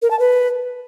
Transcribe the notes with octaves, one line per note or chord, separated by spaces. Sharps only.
A#4
A5
B4